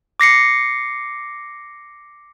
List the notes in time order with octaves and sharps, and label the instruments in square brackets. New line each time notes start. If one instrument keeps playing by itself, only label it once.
[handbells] D6 A#6 C7 C#7